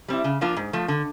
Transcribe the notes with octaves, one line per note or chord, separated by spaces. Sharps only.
G3 C4 E4
C#3
F3 A#3 D4 F4
G#2
F3 A3
D3